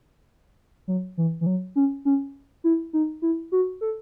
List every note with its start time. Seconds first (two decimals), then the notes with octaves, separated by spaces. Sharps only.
0.88 F#3
1.17 E3
1.41 E3
1.46 F#3
1.76 C#4
2.05 C#4
2.64 E4
2.93 D#4
3.22 E4
3.52 F#4
3.81 A4